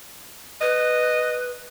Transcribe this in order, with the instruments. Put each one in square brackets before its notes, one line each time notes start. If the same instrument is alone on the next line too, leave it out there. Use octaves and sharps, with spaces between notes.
[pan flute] B4 [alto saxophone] D#5